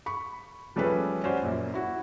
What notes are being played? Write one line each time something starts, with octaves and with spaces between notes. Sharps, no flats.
B5 C#6
F3 G3 A3 C#4 G#4 B4
C#4 F#4 C5 D5
F#2 A#2
E4 F#4